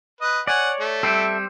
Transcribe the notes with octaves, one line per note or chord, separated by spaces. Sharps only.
B4 D#5
C#5 D5 F#5 G#5
A3
G3 C4 A4 E5